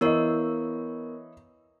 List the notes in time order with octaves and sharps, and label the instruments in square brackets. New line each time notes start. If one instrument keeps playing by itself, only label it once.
[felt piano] E3 D#5 [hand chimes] B3 A#4 C#5